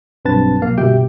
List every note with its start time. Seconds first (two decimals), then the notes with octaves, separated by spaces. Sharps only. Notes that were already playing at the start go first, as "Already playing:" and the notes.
0.25 B1 G2 C4 B4 A5 A6
0.62 B1 A#3 F5
0.78 G1 C2 B2 G4 E5 G5